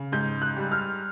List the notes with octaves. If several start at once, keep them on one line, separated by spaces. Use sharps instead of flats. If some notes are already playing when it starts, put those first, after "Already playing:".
Already playing: C#3
G#2 G6
F#6
G3
F6